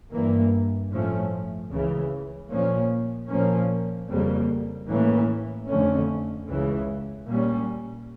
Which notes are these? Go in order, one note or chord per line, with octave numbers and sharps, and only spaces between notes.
G2 E3 A#3
A2 F3 A3 C#4
C#2 C#3 E3
A#2 F3 A#3 C#4
A#2 F3 A#3 C#4
F2 C#3 G3 A#3
A2 E3 A#3 C#4
F2 D3 A3 C#4
C#2 C#3 E3
A#2 G3 A#3 C#4